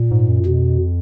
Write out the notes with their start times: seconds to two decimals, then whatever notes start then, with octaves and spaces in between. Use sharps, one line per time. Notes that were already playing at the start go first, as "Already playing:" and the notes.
Already playing: A#2
0.11 G#2
0.29 F#2
0.46 F2 B2